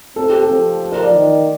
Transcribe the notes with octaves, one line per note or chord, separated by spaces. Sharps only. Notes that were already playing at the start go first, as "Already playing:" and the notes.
C4 A4
G4
A4
F3
A#4
D5
D#3